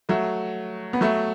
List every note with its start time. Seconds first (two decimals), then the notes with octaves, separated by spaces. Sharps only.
0.09 F#3 A3
0.93 B3
1.01 F#3 A3